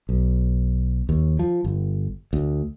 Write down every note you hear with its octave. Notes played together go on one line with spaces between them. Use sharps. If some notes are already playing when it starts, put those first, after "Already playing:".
B1
D#2
F3
G1
D2